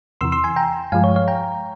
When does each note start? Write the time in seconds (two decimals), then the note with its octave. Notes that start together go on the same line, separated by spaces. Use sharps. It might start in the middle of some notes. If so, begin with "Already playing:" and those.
0.21 E2 C3 E3 C6 E6
0.32 C6 E6
0.44 G#5 C6
0.56 G5 A#5
0.92 G2 F3 G#3 F5 G#5
1.04 C#5
1.16 C#5 F5
1.28 G5 A#5